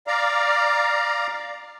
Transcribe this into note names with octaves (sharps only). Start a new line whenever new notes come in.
D5 F5 A#5